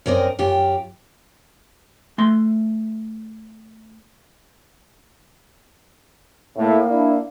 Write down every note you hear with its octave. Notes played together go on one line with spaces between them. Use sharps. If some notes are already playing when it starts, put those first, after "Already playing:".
F#2 C4 A#4 D5 D#5
F#2 F4 G4
A3 C6
A2 A#3
D4 E4